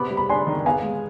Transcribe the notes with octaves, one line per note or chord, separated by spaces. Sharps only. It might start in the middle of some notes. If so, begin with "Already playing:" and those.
Already playing: C3 B3 B5 D6
G3
B5
D4 G#5 C6
D#3
B3 F5 G#5
G#3